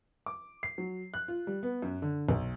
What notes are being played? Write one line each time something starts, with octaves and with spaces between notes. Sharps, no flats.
D6
C7
F#3
F#6
F4
G3
B3
F#2
D3
B1